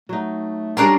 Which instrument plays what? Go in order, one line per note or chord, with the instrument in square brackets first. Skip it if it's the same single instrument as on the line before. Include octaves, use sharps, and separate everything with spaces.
[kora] F#3 D#4 [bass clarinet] A3
[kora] G3 G#3 C#4 [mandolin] D4 A#4 C6